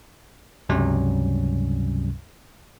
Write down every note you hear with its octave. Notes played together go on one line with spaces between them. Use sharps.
C#2 G2 C3 F#3 G3 C#4